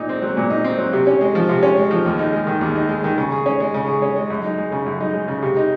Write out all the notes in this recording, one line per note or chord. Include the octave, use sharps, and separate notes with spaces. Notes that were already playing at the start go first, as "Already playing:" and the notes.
Already playing: A#2 D#4
C4
F#3
A#2
D#4
C4
F#3
C3
C#4
G#3
F3
C3
C#4
G#3
F3
D#2
D#4
G#3
D#3
D#2
D#4
G#3
D#3
C#3
G#4
C#4
G#3
C#3
G#4
C#4
G#3
F#2
D#4
G#3
C#3
F#2
D#4
G#3
C#3
C3
D#4